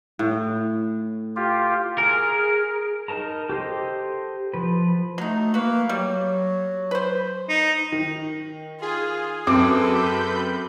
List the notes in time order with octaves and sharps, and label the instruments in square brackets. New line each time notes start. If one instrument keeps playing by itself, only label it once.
[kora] A2
[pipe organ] F4 G4
[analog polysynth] G#4 [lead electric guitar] A#4
[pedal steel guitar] D#4 A#4 A5 A#5
G4 A4 C5 D#5
F3 B4
[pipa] F#3 D#4 [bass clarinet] A3
[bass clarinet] A#3 [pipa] F#4 B4
[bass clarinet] F#3 [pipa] G3
[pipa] B4 C5
[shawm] D#4
[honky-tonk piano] D#3
[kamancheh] F4 [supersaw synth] G#4
[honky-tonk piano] F#2 C4 D6 [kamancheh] A4 B4
[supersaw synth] B5 G6